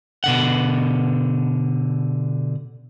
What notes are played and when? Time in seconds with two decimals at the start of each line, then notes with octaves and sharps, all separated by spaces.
0.24 B2 D3 F#5